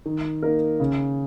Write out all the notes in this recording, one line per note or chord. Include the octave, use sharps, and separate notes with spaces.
D#3
A#3 D#4 A#4
C#3